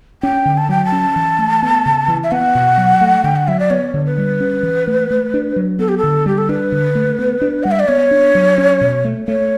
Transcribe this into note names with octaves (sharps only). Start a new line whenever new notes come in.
C#4 G5
D3
A5
F#3 G5
A5
C#4
E3
A3
B3
C#3
E3
E5
B3 F#5
B2
F#3
A3
D3 G5
F#5
F#3 E5
D5
B3 C#5
D3
B4
G3
C#4
E3
A3
A3
D4
F#3
B3 A4
G4
A4
D3
G3 G4
A4
D4 B4
D3
A3
B3
D4
G3 F#5
E5
D5
B3 C#5
D4
F#3
C#4
B2
A3
A3 C#5